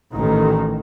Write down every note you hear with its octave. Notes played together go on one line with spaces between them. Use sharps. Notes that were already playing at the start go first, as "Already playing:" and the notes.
A1 D#3